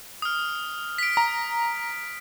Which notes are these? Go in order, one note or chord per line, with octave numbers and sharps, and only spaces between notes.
D#6 F6
B6 D7
A#5